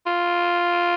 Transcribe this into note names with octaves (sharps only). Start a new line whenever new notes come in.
F4